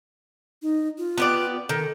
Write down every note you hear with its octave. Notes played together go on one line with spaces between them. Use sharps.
D#4
F4
B3 G4 D5
D#3 A4